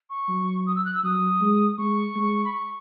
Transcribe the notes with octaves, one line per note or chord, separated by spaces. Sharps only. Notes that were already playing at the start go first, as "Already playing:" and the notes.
C#6
F#3
D#6
E6
F#6
E6
F#3 D#6
G#3
G#3 C#6
G#3
B5
C#6